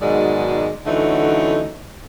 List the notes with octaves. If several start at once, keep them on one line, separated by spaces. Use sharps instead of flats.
G#2 B2 D#3 F#3 G#3 D5
D3 E3 F#3 A3 C#4 D#4